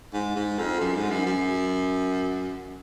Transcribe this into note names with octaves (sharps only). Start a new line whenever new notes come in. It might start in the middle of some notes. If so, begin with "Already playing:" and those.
G#2
G#2
F2
F#2
G#2
F#2
F#2